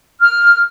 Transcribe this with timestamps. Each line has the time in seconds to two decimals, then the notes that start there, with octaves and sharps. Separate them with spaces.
0.21 F6